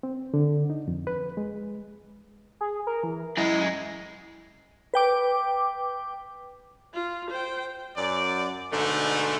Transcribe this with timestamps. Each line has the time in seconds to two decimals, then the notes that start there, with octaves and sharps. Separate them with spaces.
0.03 C4
0.34 D3
0.70 D#4
0.88 F2
1.07 B4
1.37 G#3
2.61 G#4
2.87 A#4
3.03 E3
3.37 F#2 G#3 E4
4.94 B4 G5 D6
6.94 F4
7.30 C5 G5
7.96 F#2 D5
8.71 G#2 B2 D3 A3